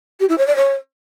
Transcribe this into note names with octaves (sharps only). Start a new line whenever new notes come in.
G4
E4
C#5
D5
C#5